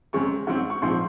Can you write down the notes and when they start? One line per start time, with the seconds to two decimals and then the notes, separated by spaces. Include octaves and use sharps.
0.13 F#2 C#3 G#3 C4 C#6
0.47 G#2 F#3 C4
0.70 C#6
0.82 A#1 G#2 F3 C4 C6